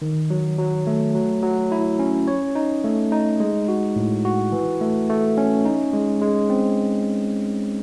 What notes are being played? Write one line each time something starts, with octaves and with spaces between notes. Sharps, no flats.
D#3
F#3
F#3
A3
F#3
F#3
E4
C#4
C#5
D#4
A3
D#4
G#3
F#4
A2
F#4
E3
A3
A3
C#4
D#4
G#3
G#3
C4